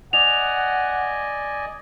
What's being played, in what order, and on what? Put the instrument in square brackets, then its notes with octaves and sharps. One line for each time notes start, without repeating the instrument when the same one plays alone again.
[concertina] D5 D#5 G#5 [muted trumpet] F#5 [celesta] F7